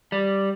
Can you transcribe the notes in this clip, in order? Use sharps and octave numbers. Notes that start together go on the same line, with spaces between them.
G3